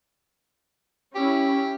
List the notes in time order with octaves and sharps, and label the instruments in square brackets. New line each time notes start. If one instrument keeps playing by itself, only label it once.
[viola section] C#4 E4 [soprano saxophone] G4